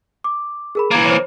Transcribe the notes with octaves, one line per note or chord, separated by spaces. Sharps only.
D6
G#4 A#4 B5
E3 A#3 A#5 G#6 A6
C5 C#5